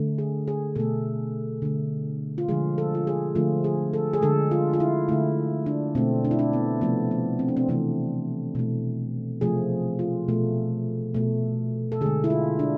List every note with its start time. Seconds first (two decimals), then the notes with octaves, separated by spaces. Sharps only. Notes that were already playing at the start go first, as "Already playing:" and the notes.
Already playing: D3 A3
0.18 G#4
0.48 G#4
0.76 B2 A3 A4
1.62 D3 A3
2.38 F4
2.48 D3 F3 G#3 G#4
2.78 A4
2.95 F4
3.07 G#4
3.35 D3 F3 A3 F4
3.64 G#4
3.93 A4
4.13 G#4
4.22 D3 G#3 A4
4.51 F4
4.74 F4
4.80 E4
5.08 D3 A3 E4
5.66 D4
5.95 B2 A3 C4
6.25 D4
6.31 E4
6.39 D4
6.53 B3
6.81 C3 F3 A3 B3
7.11 B3
7.39 C4
7.48 D4
7.57 C4
7.69 C3 E3 A3 C4
8.55 B2 A3
9.41 C3 F3 A3 G#4
9.99 F4
10.28 B2 A3
11.14 B2 A3
11.92 A4
12.01 D3 G#3 G#4
12.24 E4
12.30 F4
12.59 D4